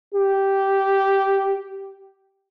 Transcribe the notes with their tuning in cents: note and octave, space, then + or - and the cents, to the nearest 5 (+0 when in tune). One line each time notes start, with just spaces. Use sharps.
G4 -5